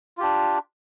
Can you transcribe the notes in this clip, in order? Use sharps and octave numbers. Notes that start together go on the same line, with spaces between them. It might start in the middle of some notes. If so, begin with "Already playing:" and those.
D4 F4 G4